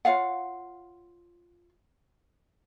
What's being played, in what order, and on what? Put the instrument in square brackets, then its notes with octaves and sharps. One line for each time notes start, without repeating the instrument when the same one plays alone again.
[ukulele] F4 C#5 F5 F#5